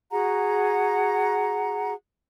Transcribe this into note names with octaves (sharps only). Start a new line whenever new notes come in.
F#4 G#4 F#5 A#5